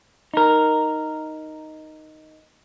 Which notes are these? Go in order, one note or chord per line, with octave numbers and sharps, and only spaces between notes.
D#4 A#4